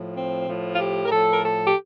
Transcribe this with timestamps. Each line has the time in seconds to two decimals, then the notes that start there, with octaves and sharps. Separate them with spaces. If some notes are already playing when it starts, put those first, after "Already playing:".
Already playing: A2 F3
0.15 C4
0.47 A2 F3
0.73 F4
0.79 G4
1.04 A#4
1.11 A2 F3 A4
1.33 A#4
1.43 A4
1.66 G4